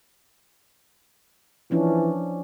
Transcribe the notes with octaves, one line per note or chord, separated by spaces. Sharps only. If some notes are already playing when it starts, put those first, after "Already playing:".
E3 F3 C#4 D4